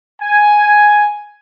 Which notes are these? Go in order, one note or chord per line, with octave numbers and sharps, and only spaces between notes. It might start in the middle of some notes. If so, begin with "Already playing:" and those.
G#5